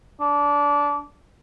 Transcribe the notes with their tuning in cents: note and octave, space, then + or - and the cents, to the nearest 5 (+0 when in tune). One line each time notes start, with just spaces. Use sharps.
D4 -20